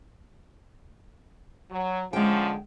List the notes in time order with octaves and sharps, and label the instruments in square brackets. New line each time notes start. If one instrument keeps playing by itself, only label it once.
[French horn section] F#3
[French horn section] D3 F3 C#4 [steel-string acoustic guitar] G#3 G5